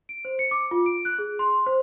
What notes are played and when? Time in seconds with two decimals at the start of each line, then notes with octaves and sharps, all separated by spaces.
0.09 D7
0.25 C5
0.39 C#7
0.51 D6
0.71 F4
0.86 D7
1.05 F#6
1.19 G#4
1.39 C6
1.66 C5